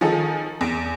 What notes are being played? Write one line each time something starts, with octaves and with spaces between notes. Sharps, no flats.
D#3 F3 D#4 G#4 A4
E2 D7